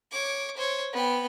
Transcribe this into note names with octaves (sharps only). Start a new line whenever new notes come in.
C#5 D6
C5 C#5
B3 G5